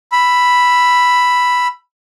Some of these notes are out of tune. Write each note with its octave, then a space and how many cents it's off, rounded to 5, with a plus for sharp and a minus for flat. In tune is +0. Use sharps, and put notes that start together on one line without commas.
B5 +0 E6 +15